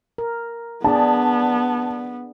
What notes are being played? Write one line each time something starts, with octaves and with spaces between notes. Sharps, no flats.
A#4
B3 D4 G#4 D5 A5